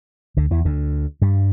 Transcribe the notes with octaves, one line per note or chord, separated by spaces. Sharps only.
D2 D3
E2 E3
D2 D3
G2 G3